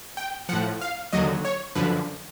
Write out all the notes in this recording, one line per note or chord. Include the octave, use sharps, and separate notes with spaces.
G5
A2 F3 F#5
F5
D#2 D3 F#3 D#5
C#5
F#2 D3 F3 B4